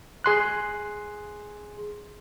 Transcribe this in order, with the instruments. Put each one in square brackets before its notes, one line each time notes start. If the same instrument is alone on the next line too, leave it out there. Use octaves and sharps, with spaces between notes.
[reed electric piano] G#4 C6 F#6